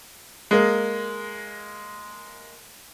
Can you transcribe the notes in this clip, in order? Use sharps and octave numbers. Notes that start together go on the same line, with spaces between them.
G#3 A#3